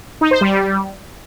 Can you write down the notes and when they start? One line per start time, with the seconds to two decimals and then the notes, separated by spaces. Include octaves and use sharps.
0.21 D#4
0.31 C5
0.41 G3